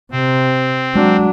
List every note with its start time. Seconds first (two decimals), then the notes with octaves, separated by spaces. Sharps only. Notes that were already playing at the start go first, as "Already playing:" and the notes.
0.12 C3 C4
0.95 F#3 G#3 D4